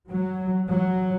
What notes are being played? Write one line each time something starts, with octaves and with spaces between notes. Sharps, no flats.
F#3
F#3